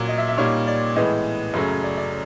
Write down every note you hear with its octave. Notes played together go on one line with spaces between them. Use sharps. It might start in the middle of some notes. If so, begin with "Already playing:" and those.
Already playing: A#2 F#3 A#3
D#5
E5
E5
A#2 G3 A#3 D#4 C#5
D5
A2 E3 G#3 B3 D#5
F#2 C#3 F#3 A3 C#4
D5
D5